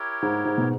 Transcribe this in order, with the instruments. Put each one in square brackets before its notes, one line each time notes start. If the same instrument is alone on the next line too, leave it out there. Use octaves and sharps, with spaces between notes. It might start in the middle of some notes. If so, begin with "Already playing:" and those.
Already playing: [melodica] E4 G4 A#4 C#5
[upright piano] G#2
G#2
B2